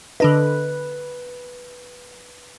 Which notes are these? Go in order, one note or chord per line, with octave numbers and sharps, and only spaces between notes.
D3 D4 B4 D#5